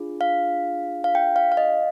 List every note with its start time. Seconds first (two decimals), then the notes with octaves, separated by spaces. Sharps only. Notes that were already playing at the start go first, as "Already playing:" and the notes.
Already playing: D4 F4 G#4
0.21 F5
1.04 F5
1.15 G5
1.36 F5
1.52 F5
1.57 D#5